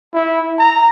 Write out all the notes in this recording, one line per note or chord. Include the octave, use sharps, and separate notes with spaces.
E4
A#5